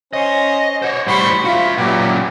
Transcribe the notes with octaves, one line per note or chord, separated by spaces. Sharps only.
C#4 C5 D#5
F#4 C5 C#5
A2 G3 C5 B5 C#6
F4 F#4 E5
F#2 A#2 F#3 B3 G4